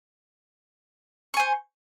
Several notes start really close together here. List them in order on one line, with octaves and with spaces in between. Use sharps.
C#6 G#5 C5